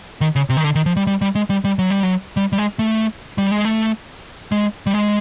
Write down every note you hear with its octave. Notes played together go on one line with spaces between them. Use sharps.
D#3
C#3
C3
D#3
D3
D#3
F3
G3
G3
G3
G#3
G3
G3
F#3
G3
F#3
G3
G3
G#3
A3
G3
G#3
A3
G#3
G3
G#3